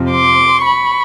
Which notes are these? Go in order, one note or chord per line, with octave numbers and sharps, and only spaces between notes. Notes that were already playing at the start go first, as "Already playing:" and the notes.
Already playing: F2 C3 F3
C6 D6
B5 C#6